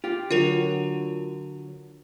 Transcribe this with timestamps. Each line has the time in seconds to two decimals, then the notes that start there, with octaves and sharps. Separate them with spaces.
0.04 F4 G4
0.31 D3 F#3 F4 A#4 F7